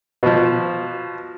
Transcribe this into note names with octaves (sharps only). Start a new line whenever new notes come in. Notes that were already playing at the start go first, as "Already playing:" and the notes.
B2 F3